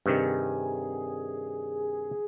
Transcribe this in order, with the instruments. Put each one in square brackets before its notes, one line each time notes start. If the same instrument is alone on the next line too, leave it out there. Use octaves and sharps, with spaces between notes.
[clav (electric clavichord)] G2 C3 D#3 [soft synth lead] G#4